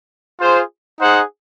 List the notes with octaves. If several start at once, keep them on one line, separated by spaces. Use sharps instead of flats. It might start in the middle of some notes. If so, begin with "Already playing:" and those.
F4 G#4 C5
D#4 G#4 C5 F#5